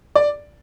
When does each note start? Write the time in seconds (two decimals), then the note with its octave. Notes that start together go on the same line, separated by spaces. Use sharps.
0.15 D5